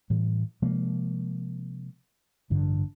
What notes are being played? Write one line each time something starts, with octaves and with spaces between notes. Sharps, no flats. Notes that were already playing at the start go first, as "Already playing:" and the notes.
A2 E3 G3
C3 F3 G#3 A#3
A1 G2 D3 D4